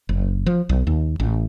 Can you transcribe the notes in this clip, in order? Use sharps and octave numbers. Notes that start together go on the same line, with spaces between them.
F#1
F3
B1
D#2
A1